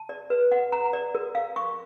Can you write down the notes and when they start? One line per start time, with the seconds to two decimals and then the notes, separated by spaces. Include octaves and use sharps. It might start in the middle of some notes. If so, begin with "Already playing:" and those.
Already playing: A5
0.09 D5
0.30 B4
0.52 F#5
0.72 A#5
0.93 D5
1.15 A#4
1.35 F5
1.56 C#6